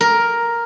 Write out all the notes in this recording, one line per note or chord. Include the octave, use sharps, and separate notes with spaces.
A#4